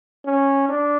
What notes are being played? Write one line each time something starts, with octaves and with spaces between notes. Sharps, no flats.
C#4
D4